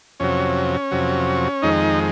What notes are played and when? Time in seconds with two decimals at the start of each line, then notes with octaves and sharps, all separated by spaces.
0.20 F2 C3 F#3 C#4
0.91 F2 C3 F#3
1.62 F2 D#3 G#3 D#4